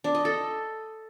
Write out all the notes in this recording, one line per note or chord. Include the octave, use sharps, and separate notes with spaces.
D4
D#5
A4